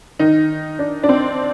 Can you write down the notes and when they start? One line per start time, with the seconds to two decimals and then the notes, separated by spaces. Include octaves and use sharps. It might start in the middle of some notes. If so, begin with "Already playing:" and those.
0.19 D#3 D#4
0.79 D4
1.03 D4
1.09 C4